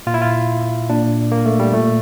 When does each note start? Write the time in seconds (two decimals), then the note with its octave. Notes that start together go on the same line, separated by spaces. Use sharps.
0.07 A#2 F4
0.14 E4
0.21 F4
0.89 A#2 D4
1.32 A#3
1.46 A3
1.59 G3
1.73 A#2 A3